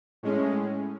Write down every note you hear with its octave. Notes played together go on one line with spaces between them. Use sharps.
A2 G#3 C#4